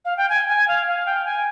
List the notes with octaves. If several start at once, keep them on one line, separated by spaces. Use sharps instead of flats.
F5
G5
G#5
G#5
F5
F5
G5
G#5